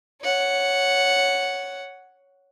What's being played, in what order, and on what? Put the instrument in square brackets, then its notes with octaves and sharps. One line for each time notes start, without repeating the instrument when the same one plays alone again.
[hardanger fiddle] C#5 F#5